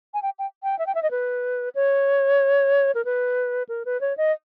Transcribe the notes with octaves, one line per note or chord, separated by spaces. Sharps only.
G#5
G5
G5
G5
E5
G5
E5
D#5
B4
C#5
A#4
B4
A#4
B4
C#5
D#5